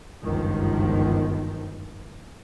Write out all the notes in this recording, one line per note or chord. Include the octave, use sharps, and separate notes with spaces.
G1 C#2 F#2 D#3 F3